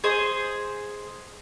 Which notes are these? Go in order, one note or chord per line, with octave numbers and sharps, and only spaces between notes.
G#4 C5 D#5